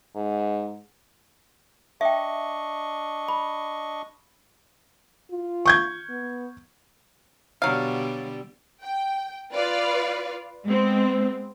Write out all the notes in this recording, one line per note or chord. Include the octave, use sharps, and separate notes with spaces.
G#2
D4 D#5 E5 G5 C#6
B5
F4
C#6 G6 G#6
B3
B2 D3 F#3 G3 F5
G5
F4 B4 D5 F5
G#3 B3 C4